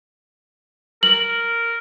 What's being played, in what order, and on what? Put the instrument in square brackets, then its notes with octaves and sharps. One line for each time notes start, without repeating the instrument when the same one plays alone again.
[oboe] A#4 [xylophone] F#7